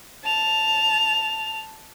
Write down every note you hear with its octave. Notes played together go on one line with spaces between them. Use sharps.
A5 F7